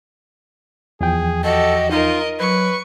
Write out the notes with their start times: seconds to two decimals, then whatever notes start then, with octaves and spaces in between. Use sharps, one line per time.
1.01 E2 F3 G#4 G5
1.44 F#4 G4 A4 D#5
1.91 D#4 F4 A#4 D#5
2.40 F#3 B4 C#6